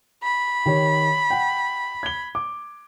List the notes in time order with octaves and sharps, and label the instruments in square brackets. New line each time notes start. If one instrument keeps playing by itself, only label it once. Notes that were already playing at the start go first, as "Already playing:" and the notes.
[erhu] B5
[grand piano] D#3 G4 C#5
F#5 G5
G#6 G7
D6